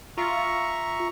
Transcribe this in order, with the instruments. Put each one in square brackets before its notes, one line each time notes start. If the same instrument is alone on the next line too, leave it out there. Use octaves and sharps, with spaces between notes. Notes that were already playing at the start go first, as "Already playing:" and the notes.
[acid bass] F4 [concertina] E5 A#5 C#6